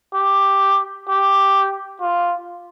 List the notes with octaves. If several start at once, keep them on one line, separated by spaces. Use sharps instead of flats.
G4
G4
F4